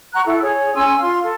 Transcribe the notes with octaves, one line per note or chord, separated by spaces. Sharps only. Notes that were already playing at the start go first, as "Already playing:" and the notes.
F#5 A#5 C#6 F#6
E4 A4
G#4 C#5
C#4 G#5 C6 E6
F4 F5 C6
A4